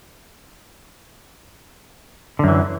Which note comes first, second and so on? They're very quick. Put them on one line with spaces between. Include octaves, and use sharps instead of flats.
D3 F#2 E3